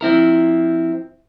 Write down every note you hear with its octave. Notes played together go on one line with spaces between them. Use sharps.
F3 C4 E4 A#4